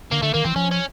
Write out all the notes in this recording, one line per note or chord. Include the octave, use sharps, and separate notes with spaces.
D3 A#3
D3 A3
D#3 A#3
E3 C4
F3 C#4
C#4